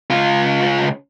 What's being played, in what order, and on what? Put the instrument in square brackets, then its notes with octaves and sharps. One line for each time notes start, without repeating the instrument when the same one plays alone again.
[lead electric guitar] C#2 F4